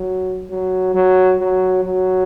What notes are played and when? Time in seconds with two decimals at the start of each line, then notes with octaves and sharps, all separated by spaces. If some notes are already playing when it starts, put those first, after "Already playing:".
Already playing: F#3
0.50 F#3
0.94 F#3
1.39 F#3
1.84 F#3